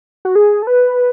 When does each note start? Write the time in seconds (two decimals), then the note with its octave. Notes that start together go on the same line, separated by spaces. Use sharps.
0.25 F#4
0.35 G#4
0.62 A4
0.67 B4